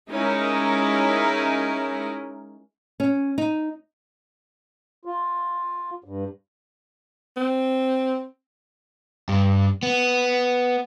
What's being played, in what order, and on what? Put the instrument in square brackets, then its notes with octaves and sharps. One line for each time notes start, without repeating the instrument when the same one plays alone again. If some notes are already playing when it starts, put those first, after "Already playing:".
[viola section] G#3 C#4 D#4 E4 A#4
[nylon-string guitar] C#4
D#4
[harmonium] F4
G2
[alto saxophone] C4
[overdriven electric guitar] G2
B3